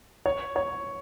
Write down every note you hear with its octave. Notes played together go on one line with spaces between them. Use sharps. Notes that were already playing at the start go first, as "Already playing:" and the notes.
C#5
C#5